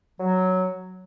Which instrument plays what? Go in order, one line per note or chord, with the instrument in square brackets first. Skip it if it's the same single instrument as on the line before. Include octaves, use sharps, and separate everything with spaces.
[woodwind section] F#3